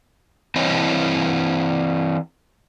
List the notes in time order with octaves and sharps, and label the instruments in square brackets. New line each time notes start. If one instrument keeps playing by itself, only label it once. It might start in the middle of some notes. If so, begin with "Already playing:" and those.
[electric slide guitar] E3 C4 E4 C#5 D#5